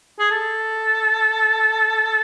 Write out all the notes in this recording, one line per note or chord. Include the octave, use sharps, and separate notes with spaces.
G#4
A4